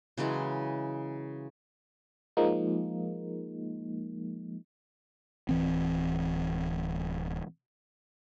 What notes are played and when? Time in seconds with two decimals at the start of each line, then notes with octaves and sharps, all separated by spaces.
0.18 C#3 E3 F#3 G#3
2.37 F3 G#3 A#3 D#4
5.49 D1 E3 C4